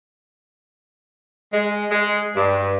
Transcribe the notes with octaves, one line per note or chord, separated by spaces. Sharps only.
G#3
G#3
G2